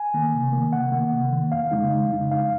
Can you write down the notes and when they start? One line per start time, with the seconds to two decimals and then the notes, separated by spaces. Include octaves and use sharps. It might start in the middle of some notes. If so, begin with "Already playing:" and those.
Already playing: G#5
0.14 D#3 A#3
0.34 C3
0.53 D#3 A#3
0.73 C3 F#5
0.92 D#3 A#3
1.13 C3
1.32 D#3 A#3
1.52 F2 F5
1.71 C#3 G#3 D#4
1.92 F2
2.11 C#3 G#3 D#4
2.31 F2 F5